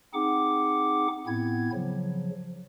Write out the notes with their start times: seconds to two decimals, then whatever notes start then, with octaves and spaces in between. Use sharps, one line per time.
0.14 C4 D#4 G#4 F#5 D6
1.27 A2 B3 C4 E4 G#6
1.74 C#3 F3 F#3